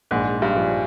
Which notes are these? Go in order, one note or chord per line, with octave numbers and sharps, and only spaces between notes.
A#1 G#2
G2
F3